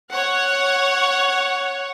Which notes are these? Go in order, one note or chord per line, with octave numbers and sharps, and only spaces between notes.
C#5 F#5